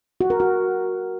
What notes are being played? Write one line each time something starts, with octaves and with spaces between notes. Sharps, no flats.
F#4
A#4
F#4